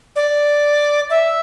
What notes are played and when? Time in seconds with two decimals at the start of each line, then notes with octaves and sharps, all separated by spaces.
0.16 D5
1.10 E5